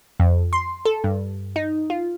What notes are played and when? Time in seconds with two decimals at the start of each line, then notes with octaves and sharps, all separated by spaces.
0.20 F2
0.53 C6
0.86 A4
1.04 G2
1.56 D#4
1.90 F4